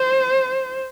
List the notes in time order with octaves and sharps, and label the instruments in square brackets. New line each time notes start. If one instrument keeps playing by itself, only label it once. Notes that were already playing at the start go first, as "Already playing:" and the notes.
Already playing: [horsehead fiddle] C5